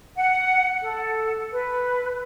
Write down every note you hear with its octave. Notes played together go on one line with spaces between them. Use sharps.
F#5
A4
B4